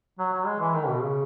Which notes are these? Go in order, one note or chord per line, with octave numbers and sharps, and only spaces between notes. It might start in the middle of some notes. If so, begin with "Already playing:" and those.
F#3
F#3
G#3
E3
D#3
B2
C#3